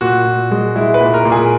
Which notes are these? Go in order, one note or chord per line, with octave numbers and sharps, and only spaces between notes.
A#2 F#4
A#2
G#3
G#3 E4
B4
A#2
A#4
A#2
G#4